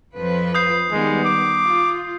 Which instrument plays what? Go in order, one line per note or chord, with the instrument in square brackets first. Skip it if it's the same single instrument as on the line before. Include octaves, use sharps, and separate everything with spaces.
[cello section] F2 F3 B4
[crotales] D#6 G6 C7
[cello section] D#3 G3 B3 [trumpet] G#3
[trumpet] D6
[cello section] F4